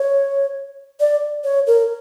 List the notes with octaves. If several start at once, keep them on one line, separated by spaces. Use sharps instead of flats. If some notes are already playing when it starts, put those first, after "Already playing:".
Already playing: C#5
D5
C#5
A#4